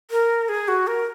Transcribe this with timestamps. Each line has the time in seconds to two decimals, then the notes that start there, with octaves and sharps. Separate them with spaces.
0.11 A#4
0.49 G#4
0.68 F#4
0.87 A#4